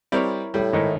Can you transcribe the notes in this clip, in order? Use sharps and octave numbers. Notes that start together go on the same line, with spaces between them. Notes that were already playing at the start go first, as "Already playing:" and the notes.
G3 C4 E4 A#4 C#5 D5
A2 G3
G#2 D#3 D#4 E4